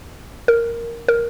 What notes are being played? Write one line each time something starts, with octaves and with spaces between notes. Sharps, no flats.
A#4
A#4